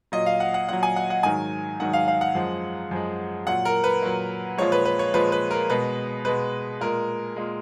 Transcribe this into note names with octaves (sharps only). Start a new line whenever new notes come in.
A#2 F#3 D#5
F5
F#5
F#5
A#2 F#3 F#5
G#5
F#5
F#5
G#2 D#3 F#3 G#5
G#2 D#3 F#3 F#5
F5
F5
F#5
F#2 F3 G#3
F#2 F3 G#3
A#2 F#3 F#5
A#4
B4
A#2 F#3
A#2 F3 G#3 C#5
B4
B4
C#5
A#2 F3 G#3 B4
B4
A#4
B2 G#3 B4
B2 G#3 B4
A#2 G#3 A#4
A#2 G#3